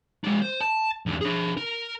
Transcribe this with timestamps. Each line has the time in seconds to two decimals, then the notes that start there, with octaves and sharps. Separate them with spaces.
0.24 G#3 D4
0.42 C5
0.61 A5
1.06 E2 D3
1.21 D4 G#4
1.57 A#4